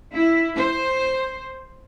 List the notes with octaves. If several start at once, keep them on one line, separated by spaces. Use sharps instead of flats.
E4
C5